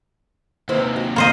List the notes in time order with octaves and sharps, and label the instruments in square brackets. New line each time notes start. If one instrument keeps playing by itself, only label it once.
[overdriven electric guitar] D#2 C3 [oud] E4 B4 C5
[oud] F#4
[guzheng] A#3 C5 D#5